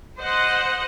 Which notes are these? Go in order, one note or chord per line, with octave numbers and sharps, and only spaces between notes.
C5 D#5 F#5